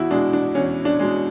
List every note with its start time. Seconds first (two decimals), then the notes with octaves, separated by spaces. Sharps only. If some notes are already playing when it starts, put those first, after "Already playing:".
Already playing: E2 E4 F#4
0.11 B2 G#3 D4
0.33 D4
0.55 E2 C#4
0.85 D4
0.99 B2 G#3